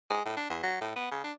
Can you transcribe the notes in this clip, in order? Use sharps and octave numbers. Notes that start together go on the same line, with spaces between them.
G#3
A2
D4
E2
F#3
A2
B3
C#3
D4